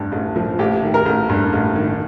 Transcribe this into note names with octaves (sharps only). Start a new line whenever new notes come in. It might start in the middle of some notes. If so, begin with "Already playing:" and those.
Already playing: A1 G2
A1
F3
A1 G4
D#3
A#4
A1
G2
A1
D#3